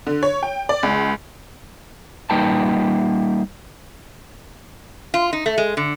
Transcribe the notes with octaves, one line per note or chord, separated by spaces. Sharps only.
D3
C#5
G5
D5
C#2
G3 A#3 D#4 B4 G5 A5
F4
D#4
A3
G#3
D3